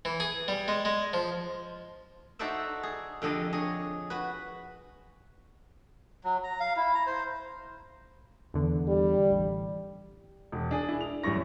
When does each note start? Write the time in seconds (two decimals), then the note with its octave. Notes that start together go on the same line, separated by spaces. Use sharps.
0.05 E3
0.20 G#4
0.48 G3
0.68 G#3
0.85 G#3
1.13 F3
2.39 D#4 F#4 A4 C5 D5 E5
2.83 G#4
3.22 F2 D3 G4 D#5 A5
3.53 G#4 C#5 D#5
4.10 F#4 B4
6.24 F#3
6.44 A#5
6.60 F5
6.77 E4
6.95 A#5
7.07 C5
8.54 E2 D3
8.88 G3
9.30 A1
10.52 E1
10.71 D4 G#4
10.89 E4
11.01 F7
11.23 A1 F#2 G3 E4 C#6 A#6